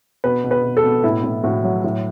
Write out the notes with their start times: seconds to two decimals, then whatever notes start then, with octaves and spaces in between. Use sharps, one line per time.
0.24 B2 B4
0.44 B2
0.51 B4
0.64 B2
0.77 A4
0.84 B2
1.04 A2 E4
1.23 A2
1.44 A2 F#4
1.64 F#3
1.84 A2